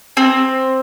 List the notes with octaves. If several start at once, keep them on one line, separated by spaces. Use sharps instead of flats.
C4